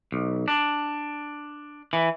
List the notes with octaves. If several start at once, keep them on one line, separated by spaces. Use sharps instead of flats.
B1
D4
E3